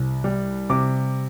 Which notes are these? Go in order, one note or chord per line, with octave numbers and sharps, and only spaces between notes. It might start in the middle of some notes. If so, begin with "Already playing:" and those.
Already playing: C2 C3
G3
C3 D6